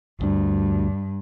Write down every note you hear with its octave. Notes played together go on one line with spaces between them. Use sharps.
D2 G2 D4